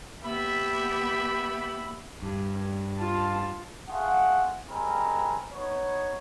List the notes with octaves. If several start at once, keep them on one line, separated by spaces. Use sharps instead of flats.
A#3 B3 G4 E5 B5
G2
F4 A5
A3 F4 G#4 F#5
G3 G#3 C4 A#4 G#5 B5
B3 D#4 B4 C#5